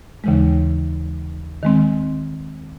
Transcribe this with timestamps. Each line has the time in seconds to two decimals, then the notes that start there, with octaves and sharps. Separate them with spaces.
0.24 D#2 C#3 E3 G#3
1.63 D#3 G#3 C4